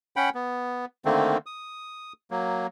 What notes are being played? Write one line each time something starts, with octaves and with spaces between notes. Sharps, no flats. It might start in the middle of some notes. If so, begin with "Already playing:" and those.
C#4 F#5 G5 B5
B3
D3 D#3 A3 A#3 C4
D#6
F#3 A#3